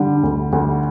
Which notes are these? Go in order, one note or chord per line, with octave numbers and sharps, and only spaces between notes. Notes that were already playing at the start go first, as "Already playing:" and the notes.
Already playing: D3 G3
D2
D2